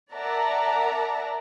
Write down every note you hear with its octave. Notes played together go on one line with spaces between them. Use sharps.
A#4 D5 E5 F#5 A5 A#5